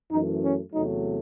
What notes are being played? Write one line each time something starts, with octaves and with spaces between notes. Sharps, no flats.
F#2 E3 A3 D#4
C#4
E2 C3 F#3 A3 D#4